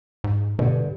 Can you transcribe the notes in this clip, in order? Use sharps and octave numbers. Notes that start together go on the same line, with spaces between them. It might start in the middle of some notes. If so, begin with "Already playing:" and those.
G#2
G2 B2 D3